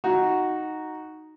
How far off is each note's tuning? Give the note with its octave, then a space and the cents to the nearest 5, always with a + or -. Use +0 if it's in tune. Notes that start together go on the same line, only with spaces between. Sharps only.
D#4 +0 F#4 +0